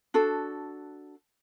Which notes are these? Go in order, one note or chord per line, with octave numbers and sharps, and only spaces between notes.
D4 F#4 A4